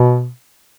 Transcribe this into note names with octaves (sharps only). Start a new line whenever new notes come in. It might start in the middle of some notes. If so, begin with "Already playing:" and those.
Already playing: B2